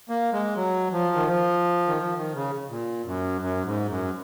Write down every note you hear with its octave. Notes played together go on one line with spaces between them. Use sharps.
A#3
G#3
F#3
F3
D#3
F3
D#3
F3
D#3
C#3
A#2
F#2
F#2
G#2
F#2